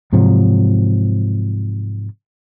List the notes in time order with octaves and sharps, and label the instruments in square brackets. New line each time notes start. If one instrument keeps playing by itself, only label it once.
[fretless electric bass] G#2 C3 F3 F#3